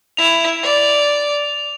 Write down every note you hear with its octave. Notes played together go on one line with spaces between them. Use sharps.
E4 F7
D5